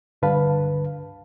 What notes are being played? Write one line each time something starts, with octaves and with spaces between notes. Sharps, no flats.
C#2 G2 D3 B4 F5 A5